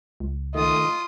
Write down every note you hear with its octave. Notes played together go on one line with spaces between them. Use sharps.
C#2
D#3 A3 F4 D#5 D#6